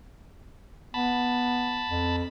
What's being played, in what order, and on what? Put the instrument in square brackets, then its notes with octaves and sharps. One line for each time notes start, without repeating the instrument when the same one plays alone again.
[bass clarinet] B3 [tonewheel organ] A5 B5
[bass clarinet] F2